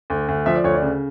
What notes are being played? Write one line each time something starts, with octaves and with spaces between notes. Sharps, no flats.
D2
D2
F3 E5
D5
D2 C#5
D5
C#3